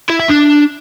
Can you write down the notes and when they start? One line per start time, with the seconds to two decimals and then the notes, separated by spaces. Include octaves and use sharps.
0.10 E4
0.19 E5
0.29 D4